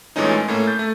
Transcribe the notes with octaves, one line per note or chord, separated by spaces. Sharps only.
A#2 E3 G#3 A3 C#4 D#4
G#3
A2 A3 A#3 C#4
G6 A6
A3